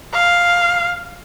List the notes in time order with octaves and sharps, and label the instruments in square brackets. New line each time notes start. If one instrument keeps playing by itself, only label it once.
[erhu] F5